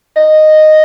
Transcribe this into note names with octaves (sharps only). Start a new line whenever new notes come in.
D#5